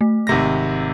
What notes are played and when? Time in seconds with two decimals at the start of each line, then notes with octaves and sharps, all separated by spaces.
0.01 A3
0.27 G#1 C3 A#6